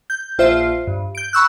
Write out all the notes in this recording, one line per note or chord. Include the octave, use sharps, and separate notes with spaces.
G6
A#1 F4 C5 E5 C7
G2
G6 D7
B5 C#6 E6 F#6